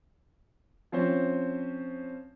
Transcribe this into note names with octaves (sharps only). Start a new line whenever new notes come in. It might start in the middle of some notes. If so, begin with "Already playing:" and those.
F3 C4 C#4 C5